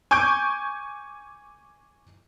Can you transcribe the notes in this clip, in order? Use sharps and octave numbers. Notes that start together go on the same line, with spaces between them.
G#5 C#6 D6 G6 D7